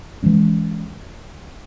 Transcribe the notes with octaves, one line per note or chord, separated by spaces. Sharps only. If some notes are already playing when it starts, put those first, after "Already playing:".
E3 G#3 C#4